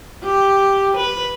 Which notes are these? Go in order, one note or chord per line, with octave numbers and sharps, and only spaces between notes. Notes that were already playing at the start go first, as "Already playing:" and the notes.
G4
B4